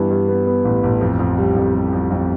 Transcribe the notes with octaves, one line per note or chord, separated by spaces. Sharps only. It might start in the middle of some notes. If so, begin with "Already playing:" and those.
Already playing: G2 E3 B3
G2
B3
B3
A1
A1
F2
F2
G3
F2
G3
F2
F2